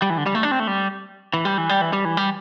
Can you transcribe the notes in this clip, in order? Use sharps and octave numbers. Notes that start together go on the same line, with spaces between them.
G3
E3
D3
G3
A3
D4
C4
A3
G3
E3
G3
E3
G3
E3
G3
E3
G3